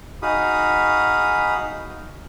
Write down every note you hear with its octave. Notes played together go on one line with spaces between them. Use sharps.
D#4 F#4 G#4 F5 B5 D#6